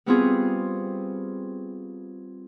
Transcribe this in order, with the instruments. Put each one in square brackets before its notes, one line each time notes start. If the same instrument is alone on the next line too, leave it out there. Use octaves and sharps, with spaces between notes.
[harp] G3 B3 C4 F4 F#4 G#4